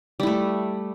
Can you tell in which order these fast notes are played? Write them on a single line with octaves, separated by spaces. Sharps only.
G3 E4 A3